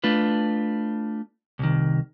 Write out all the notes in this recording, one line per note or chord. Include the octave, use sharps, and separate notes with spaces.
A3 D4 F4 B4
C2 D#3